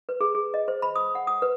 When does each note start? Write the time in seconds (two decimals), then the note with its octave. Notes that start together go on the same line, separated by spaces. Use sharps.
0.09 B4
0.21 G#4
0.35 G#4
0.54 D#5
0.68 C5
0.82 B5
0.96 D#6
1.15 F#5
1.27 D#6
1.42 B4